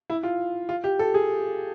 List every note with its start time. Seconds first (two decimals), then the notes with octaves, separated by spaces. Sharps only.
0.10 E4
0.23 F4
0.69 F4
0.84 G4
0.99 A4
1.14 G#4